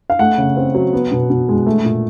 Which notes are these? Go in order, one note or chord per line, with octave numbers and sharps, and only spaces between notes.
F5
A3 F#5
C#3
C4
F#3
B3
B2
B2
G#3
A3
A#2